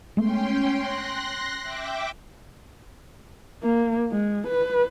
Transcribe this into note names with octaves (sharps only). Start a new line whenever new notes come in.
G#3 A3 B3 C#4 G5 C6
C6 F#6 A#6
E5 G5 D6
A#3
G#3
B4